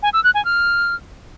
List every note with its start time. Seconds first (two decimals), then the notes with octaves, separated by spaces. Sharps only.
0.03 G#5
0.13 E6
0.24 F#6
0.34 G#5
0.45 F6